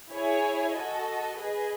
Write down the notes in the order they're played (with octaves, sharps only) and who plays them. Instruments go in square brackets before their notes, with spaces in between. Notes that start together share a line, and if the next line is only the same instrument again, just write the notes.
[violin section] E4 G#4 C#5 G#5
F#4 A4 D#5
G#4 B4 D#5